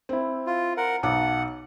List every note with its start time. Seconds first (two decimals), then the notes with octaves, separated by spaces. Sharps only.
0.09 C4 E4
0.47 F4
0.77 A#4 F#5
1.03 B1 F#5 A5 D6